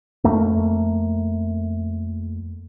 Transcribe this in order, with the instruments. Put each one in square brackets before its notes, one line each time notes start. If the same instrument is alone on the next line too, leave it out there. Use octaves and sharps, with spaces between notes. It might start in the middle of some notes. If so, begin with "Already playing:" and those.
[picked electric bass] F2 A3 A#3